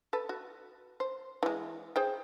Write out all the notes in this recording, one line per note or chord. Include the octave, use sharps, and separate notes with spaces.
A4 B4
F#4
C5
E3 G#3
G#4 C5 G5